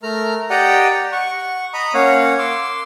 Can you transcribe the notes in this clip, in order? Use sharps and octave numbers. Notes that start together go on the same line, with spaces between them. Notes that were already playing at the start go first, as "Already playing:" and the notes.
A3 A#4 A#5 F6
G4 D5 D#5 F#5 G5 A#5
F#5 C#6
D#5 A#5 B5 D#6
A#3 C#4 C#5 F5 F#5
C6 D6 E6